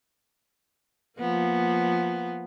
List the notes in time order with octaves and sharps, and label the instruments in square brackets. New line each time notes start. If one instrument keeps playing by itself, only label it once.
[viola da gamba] F3 A#3 B3